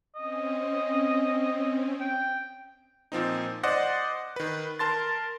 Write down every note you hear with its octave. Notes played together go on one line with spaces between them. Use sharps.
C4 C#4 D#5
G5
A#2 F3 C4 D#4
C5 D5 D#5 F#5
D#3 B4
A#4 A5 C6 A6